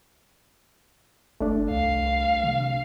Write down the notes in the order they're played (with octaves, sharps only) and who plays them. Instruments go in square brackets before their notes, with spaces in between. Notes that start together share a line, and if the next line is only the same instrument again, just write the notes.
[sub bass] F#1 [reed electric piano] A3 D4
[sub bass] C2 [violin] F5
[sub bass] C3